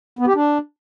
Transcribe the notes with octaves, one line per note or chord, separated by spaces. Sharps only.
B3
G4
D4